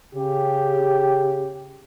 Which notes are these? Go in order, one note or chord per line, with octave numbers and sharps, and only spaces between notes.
C#3 G4